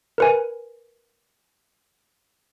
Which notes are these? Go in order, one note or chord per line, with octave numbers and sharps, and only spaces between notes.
A#4 B4 G#5